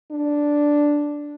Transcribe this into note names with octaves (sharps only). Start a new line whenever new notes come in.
D4